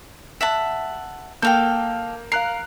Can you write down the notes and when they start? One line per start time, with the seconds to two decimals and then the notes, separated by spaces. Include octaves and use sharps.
0.41 E5 F#5 A5
1.42 A#3 A4 F5 G5 G6
2.32 A#4 F5 F#6 C7